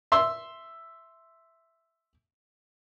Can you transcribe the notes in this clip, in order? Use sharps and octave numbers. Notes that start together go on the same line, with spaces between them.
E5 C6 E6